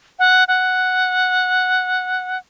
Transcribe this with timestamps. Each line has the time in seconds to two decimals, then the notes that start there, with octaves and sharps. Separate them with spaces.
0.19 F#5
0.48 F#5